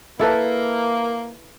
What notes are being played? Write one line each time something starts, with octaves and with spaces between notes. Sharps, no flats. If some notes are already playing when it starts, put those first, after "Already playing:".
A#3 E4 A4 B4